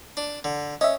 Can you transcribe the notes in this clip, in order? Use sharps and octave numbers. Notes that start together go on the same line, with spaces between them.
D4
D3
C#4 D#5 E5